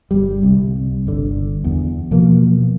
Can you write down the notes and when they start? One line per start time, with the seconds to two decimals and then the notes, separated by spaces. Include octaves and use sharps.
0.11 G1 G3
0.43 C2
1.07 G1 D3
1.64 E2
2.11 B2 F3 F#3 A#3